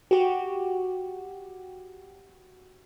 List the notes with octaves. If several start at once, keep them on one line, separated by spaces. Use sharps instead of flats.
F#4 G4